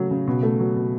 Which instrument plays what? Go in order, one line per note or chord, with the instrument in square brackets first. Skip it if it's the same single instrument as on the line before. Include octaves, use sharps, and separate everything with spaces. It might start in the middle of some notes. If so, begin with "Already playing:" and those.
Already playing: [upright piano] C#3 F#3 A3
C#3
B2
A3
F#3
B2